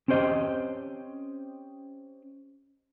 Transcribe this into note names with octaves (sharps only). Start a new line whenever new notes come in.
C4 C#4 G4 C5 D#5